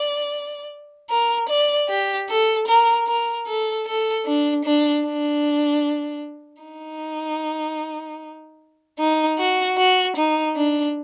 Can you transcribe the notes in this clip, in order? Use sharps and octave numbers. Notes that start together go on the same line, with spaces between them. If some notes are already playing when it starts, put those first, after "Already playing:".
Already playing: D5
A#4
D5
G4
A4
A#4
A#4
A4
A4
D4
D4
D4
D#4
D#4
F#4
F#4
D#4
D4